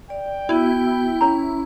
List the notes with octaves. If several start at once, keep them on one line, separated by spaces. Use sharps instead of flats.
D5 G5
B3 E4 F#4
C#4 C#5 A#5